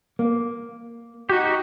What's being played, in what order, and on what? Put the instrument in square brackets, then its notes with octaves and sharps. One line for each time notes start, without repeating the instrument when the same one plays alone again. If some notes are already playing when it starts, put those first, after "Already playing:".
[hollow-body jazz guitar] A#3
[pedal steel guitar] D#4 G4 [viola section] F#4